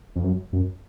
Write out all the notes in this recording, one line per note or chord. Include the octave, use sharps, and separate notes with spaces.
F2
F#2
F#2